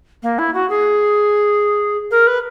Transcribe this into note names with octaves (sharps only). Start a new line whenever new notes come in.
A#3
E4
F#4
G#4
A#4
B4